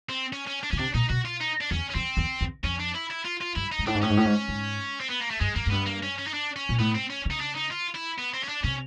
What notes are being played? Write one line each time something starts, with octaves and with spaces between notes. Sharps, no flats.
C4
C#4
C#4
D4
C#3 C#4
C3 D4
A#2 D#4
B2 F#4
F4
D#4
D4
E2 C#4
C#4
F2 C4
E2
E2
F2 C#4
D4
E4
E4
F4
F4
G2 E4
D#4
G#2
A2 D4
G#2
A2 C#4
G#2
A2
G#2
G#2
C4
B3
A#3
A3
G2 G#3
F#2 A#3
G#2
G2 B3
A#3
C#4
C#4
D#4
D4
C#4
A#2
A2 B3
C4
C#4
C#3
D#4
D4
D#4
F4
E4
B3
C4
C#4
D4
C3 C#4